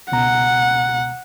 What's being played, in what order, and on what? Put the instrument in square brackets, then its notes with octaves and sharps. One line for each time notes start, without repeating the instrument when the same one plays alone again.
[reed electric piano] C#2 B2 A#5 [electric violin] F#5